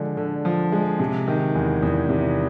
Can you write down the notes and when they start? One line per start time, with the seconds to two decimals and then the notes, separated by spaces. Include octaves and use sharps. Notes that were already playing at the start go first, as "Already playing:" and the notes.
Already playing: D3 F3 G#3
0.17 D3
0.45 F3
0.72 G#3
0.99 C3
1.28 D#3
1.55 E2
1.82 E2
2.09 C3